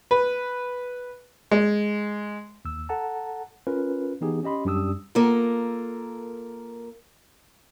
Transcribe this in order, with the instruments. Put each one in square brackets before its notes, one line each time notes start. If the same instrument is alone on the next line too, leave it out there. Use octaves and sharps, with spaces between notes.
[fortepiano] B4
G#3
[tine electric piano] D#2 E6
A4 F#5 A5 A#5
C#4 F4 A#4 B4
E3 B3 D#4 G4 G#4
C#4 G4 D#5 B5 C6
F#2 G3 D4 G4 D#6 E6
[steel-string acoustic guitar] A#3 F4 A4 A#4